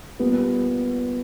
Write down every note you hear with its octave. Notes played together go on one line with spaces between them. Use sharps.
A#2 G3 B3